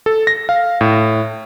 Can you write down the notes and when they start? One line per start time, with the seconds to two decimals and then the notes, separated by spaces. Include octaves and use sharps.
0.06 A4
0.27 A#6
0.49 F5
0.81 A2